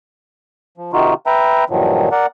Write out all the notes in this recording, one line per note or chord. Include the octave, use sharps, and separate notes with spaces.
F3
C3 D#3 D#4 F4 F#4
B4 E5 G5 A#5
G2 A#2 D#3 F3 F#3
A#4 D5 F#5